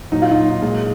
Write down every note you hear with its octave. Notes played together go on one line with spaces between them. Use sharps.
A#2 F#3 D#4
F4
D#4
A#2 G#3